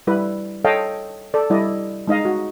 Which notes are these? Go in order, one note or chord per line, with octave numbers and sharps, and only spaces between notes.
G3 E4 B4
A4 C#5 D#5 F5 G5 A5
A4 D5
G3 E4 D5 D#5
G#3 D#4 D#5 F5
F#4